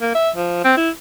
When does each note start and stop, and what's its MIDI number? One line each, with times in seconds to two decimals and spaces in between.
0.01 0.13 58
0.15 0.30 76
0.36 0.62 53
0.64 0.72 60
0.77 0.90 64